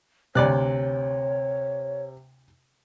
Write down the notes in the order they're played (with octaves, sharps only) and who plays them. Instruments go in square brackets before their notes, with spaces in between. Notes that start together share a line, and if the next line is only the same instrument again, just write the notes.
[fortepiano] D2 D5 F#6 [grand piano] C3 [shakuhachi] C#5